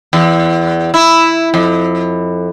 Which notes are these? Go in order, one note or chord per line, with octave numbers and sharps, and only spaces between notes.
E2
E4
F2